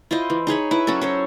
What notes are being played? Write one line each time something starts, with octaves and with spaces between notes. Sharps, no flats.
E4 F4 C5 D#5
E3
D#4 G#4 C#5 B5
E4 B4
F#3 C#4 F#4 A4
C#4 C5 C#5